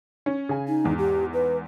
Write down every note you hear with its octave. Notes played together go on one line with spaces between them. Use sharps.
C#4
C#3 G#5
D#4
E2 G#2
G4
B4